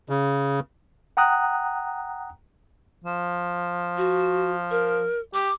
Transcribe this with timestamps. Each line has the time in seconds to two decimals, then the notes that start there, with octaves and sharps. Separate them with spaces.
0.09 C#3
1.17 F#5 G5 A#5 D#6 F#6
3.04 F3
3.97 F#4
4.71 A#4
5.34 G4 D6